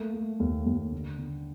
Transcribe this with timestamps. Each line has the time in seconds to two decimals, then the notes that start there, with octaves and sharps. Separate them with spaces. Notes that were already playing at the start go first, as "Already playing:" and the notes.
Already playing: A3 A#3
0.13 A3
0.40 D#2
0.66 D#2
0.92 D3
1.18 D3